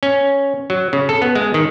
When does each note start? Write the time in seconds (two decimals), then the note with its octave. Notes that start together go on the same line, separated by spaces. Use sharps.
0.03 C#4
0.70 F#3
0.93 C#3
1.09 A4
1.22 B3
1.35 G#3
1.54 D#3